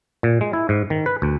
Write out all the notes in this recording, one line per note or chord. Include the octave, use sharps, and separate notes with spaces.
A#2
G#3
E4
G#2
D#3
B4
D2